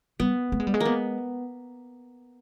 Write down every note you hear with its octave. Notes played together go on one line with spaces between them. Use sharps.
G3 B3
A3
G#3
G3
G#3
A#3
B3